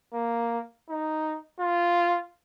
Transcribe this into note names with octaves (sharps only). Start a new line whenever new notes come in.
A#3
D#4
F4